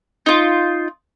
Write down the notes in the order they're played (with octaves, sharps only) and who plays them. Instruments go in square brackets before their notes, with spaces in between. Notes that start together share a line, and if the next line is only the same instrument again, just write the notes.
[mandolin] D#4 F4